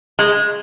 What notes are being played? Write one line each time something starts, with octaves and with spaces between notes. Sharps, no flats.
G#3